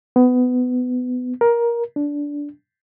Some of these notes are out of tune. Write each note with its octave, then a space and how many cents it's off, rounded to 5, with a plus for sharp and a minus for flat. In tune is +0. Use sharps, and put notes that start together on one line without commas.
B3 +20
A#4 +15
D4 -15